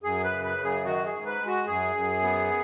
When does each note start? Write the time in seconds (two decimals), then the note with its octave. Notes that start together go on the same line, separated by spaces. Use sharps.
0.03 F#2 G#4
0.24 B4
0.31 C#3
0.44 B4
0.58 F#2
0.64 G#4
0.85 D#3 F#4
1.06 G#4
1.13 G#2
1.26 B4
1.40 G#3
1.47 F#4
1.67 F#2 G#4
1.95 F#2
2.23 B3